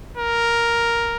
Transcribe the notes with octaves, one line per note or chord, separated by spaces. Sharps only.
A#4